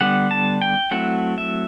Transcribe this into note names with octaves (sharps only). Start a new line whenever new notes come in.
D3 G3 B3 D4 F#5
A5
G5
F#3 A3 C4 E4 F#5
E5